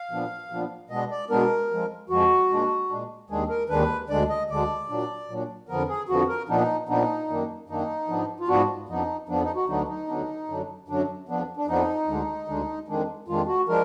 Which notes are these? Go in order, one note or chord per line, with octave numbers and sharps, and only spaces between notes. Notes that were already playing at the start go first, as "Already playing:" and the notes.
Already playing: F5
A#2 F3 B3 D4
A#2 F3 B3 D4
B2 G#3 B3 D4 D#5
D5
B2 G#3 B3 D4 A#4
F2 F3 G#3
F2 F3 G#3 F#4
A#2 G#3 D4
A#2 G#3 D4
D#2 D#3 G#3 D4 G#4
A#4
D#2 D#3 G#3 D4 B4
D2 D3 G#3 D4 D5
D#5
D2 D3 G#3 D4 D5
A#2 F#3 D4
A#2 F#3 D4
F2 D3 F3 B3 A#4
G#4
F2 D3 F3 B3 F#4
A#4
A#2 F3 B3 D4 D#4
A#2 F3 B3 D4 D#4
F#2 D#3 A#3 D4
F#2 D#3 A#3 D4 D#4
G#2 F3 B3 D4
F4
G#2 F3 B3 D4 F#4
F2 F3 B3 D4 D#4
F2 F3 B3 D4
D#4
F#4
D2 D3 F#3 B3 D4 D#4
D#4
D2 D3 F#3 B3 D4
F#2 D3 F#3 D4
F#2 D3 F#3 D4
F2 F3 B3 D4
D4
F2 F3 B3 D4 D#4
D2 D3 G#3 D4
D2 D3 G#3 D4
F2 D#3 G#3 D4
F2 D#3 G#3 D4 F4
F#4
F3 G#3 D4 A#4